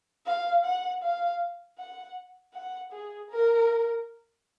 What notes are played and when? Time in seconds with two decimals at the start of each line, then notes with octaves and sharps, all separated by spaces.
0.26 F5
0.64 F#5
1.02 F5
1.78 F#5
2.54 F#5
2.92 G#4
3.30 A#4